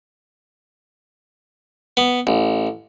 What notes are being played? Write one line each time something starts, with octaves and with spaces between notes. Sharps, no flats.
B3
A1